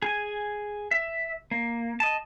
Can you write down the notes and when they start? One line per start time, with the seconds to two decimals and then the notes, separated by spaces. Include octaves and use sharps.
0.02 G#4 G#5
0.91 E5
1.51 A#3
2.00 D#5 A5